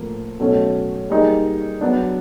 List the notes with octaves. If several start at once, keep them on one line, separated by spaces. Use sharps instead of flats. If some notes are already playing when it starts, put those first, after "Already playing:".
Already playing: A2 F3 A#3
B2 F#3 A3 C#4
G3 A#3 D#4 G#4
F#3 B3 D4